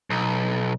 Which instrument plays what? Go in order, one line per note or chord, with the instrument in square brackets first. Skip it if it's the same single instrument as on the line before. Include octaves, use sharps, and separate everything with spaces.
[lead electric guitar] B1